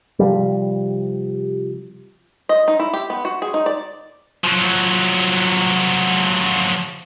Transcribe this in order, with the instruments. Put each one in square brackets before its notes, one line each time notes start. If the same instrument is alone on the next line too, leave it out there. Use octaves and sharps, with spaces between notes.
[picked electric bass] C3 F3 G3
[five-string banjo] D#5
D#4
E4
G4
B3
F#4
G#4
D#4
D5
[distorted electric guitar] F3 F#3